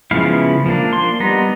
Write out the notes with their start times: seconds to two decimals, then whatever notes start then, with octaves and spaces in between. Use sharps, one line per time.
0.11 C#3 F3 G#3 B3 E4 F5
0.66 F3 A#3 D4
0.93 C6
1.20 G3 B3 D#4 A#5